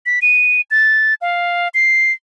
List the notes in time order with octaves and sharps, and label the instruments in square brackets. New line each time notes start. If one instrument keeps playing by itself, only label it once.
[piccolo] B6
D#7
A6
F5
C7